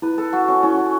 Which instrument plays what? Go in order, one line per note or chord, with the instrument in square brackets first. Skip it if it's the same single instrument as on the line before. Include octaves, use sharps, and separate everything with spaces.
[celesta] E4 [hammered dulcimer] B4
[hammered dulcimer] A4
[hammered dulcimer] F#4 [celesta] F#5
[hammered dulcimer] C#4
[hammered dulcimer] C#4 [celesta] E4